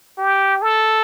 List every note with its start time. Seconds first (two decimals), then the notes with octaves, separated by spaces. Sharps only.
0.18 G4
0.62 A4